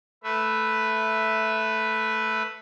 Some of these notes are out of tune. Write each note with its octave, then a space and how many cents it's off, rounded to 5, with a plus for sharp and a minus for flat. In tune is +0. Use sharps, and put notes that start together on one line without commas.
A3 +0 B4 +0 E5 +0